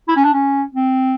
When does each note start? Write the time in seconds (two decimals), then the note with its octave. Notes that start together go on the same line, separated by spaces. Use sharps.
0.08 E4
0.16 C#4
0.24 D4
0.33 C#4
0.75 C4